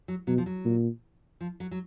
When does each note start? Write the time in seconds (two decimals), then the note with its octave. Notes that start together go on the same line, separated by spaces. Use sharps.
0.08 F#3
0.27 B2 F#3
0.38 F3
0.46 F#3
0.65 A#2
1.41 F3
1.60 F#3
1.71 F#3